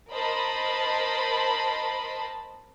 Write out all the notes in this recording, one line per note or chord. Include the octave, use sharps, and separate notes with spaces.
A#4 C5 D#5 A5 B5